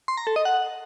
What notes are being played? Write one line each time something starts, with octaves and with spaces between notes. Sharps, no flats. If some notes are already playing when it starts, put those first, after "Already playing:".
C6
A#5
A4
D#5
F#5